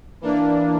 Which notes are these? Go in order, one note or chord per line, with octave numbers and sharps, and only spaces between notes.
E3 A#3 D4